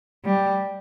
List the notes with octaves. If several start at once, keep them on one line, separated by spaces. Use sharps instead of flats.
G3